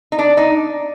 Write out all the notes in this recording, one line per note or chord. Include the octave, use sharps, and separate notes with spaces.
D#4
D4
D#4